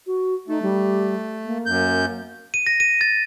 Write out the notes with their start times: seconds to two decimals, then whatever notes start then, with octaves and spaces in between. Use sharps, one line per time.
0.07 F#4
0.48 A3 D#4
0.62 G3
1.45 A#3
1.66 F#2 G6
2.54 D#7
2.67 A#6
2.80 D#7
3.01 A6